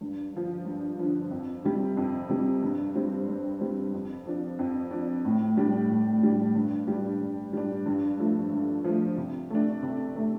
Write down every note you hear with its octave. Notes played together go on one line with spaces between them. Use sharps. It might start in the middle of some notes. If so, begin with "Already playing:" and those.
G2
D3 F3
G2
D3 F3
F2
C3 G3
F2
C3 G3
G2
G3 C4
G2
G3 C4
F2
F3 D4
F2
F3 D4
A2
G3 D4
A2
G3 D4
G2
G3 D4
G2
G3 D4
G2
F3 A3
G2
F3 A3
C3
A3 D4
C3
A3 D4